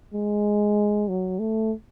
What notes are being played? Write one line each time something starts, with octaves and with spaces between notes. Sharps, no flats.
G#3
F#3
A3